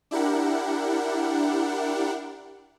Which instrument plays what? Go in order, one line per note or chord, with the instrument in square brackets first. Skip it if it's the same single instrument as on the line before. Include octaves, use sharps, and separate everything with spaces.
[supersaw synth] D4 E4 G4 A#4 F#5